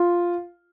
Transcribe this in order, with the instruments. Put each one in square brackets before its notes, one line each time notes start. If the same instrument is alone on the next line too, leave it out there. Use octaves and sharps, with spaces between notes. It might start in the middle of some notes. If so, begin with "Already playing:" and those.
Already playing: [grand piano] F4